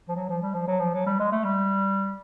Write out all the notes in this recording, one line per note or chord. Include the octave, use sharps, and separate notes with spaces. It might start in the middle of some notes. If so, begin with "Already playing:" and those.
F3
F#3
F3
G3
F3
F#3
F3
F#3
G3
G#3
A3
G3